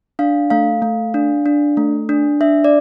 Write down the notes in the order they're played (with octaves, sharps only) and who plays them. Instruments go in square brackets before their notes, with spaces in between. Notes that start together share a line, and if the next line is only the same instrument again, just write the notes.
[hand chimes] D4 F5
A3 F5
A3
D4
D4
A3
D4
D4 E5
D5